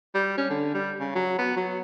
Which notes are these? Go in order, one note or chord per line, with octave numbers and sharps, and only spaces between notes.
G3
C#4
D3
G3
C#3
F#3
B3
F#3